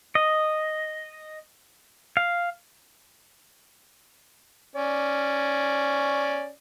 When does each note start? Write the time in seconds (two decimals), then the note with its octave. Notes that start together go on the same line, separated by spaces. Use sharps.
0.15 D#5
2.17 F5
4.76 C#4 D5